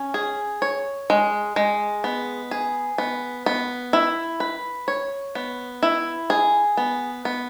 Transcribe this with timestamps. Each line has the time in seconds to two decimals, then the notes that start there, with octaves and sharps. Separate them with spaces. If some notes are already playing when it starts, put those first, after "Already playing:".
Already playing: C#4
0.14 G#4
0.62 C#5
1.10 G#3
1.56 G#3
2.04 B3
2.51 G#4
2.98 B3
3.46 B3
3.93 E4
4.40 B4
4.88 C#5
5.35 B3
5.83 E4
6.30 G#4
6.77 B3
7.25 B3